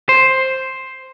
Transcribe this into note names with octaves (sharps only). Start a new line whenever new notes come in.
C5